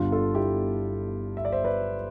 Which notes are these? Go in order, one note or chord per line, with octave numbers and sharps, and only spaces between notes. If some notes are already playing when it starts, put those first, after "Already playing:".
Already playing: G1 G2 D3 G3 B3 D4 F4
F4 A4
E4 G4
E5
D5
C5 E5
B4 D5